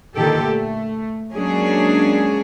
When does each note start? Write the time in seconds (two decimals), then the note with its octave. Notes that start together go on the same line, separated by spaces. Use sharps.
0.16 A#2 D3 D#3 G4 A4
0.45 A3
1.34 F#3 G#3 A#3 C#4 D4 G#4